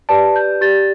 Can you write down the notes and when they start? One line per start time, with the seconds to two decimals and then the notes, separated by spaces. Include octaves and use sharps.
0.09 G4 B4 D5 A5
0.36 G6
0.61 G4 D5 A6